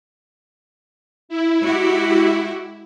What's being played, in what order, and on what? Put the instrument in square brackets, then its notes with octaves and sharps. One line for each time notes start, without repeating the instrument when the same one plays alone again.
[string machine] E4
[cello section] G#3 F#4 G4